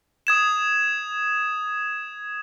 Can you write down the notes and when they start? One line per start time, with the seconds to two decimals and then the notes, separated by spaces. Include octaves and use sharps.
0.27 D#6 G#6 E7